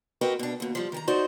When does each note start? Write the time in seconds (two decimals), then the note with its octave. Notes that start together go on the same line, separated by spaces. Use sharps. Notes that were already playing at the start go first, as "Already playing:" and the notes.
0.21 C4 F#4 A#4 B4 D#5 G5
0.39 B2 D4
0.60 D#2 B2
0.75 F3 G3
0.92 D#3 G5 A#5
1.07 D#4 F#4 C5 D5 D#5